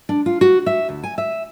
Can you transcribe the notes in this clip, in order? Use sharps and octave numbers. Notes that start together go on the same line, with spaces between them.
D4
F4
F#4
E5
D2
G#5
E5